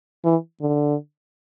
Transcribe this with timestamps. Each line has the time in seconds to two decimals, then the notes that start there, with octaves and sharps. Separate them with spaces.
0.24 E3
0.61 D3